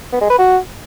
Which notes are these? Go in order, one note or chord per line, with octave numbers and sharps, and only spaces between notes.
B3
G#3
B4
F#4